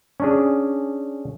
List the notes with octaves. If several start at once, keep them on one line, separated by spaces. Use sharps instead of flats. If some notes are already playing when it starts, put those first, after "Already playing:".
C#4 D4 G#4